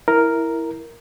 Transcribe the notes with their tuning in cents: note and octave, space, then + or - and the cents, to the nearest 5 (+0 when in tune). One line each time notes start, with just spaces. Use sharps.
E4 +0 A#4 +0